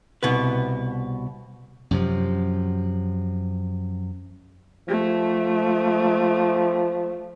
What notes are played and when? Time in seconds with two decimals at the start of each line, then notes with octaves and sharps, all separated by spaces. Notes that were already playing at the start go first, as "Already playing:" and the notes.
0.23 C2 B2 B3 B4
1.91 F#2 C3 F3
4.88 F3 A3